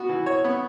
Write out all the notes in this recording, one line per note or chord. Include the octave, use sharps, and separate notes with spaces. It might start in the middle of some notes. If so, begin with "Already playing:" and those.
Already playing: B3 F#4
E3
C#5
B3